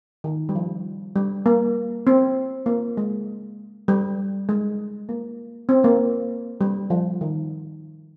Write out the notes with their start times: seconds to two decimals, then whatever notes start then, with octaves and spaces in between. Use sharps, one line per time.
0.24 D#3
0.49 G3
0.55 F3
1.16 G3
1.46 A#3
2.07 C4
2.66 A#3
2.97 G#3
3.88 G3
4.49 G#3
5.09 A#3
5.69 C4
5.84 A#3
6.61 G3
6.90 F3
7.21 D#3